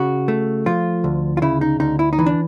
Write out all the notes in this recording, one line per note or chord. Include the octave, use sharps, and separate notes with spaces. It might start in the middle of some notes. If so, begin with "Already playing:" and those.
Already playing: C#3 F#4
A3
F3 F4
D2
F4
C#3 E4
D#4
D2 D#4
E4
D#4
E3
D4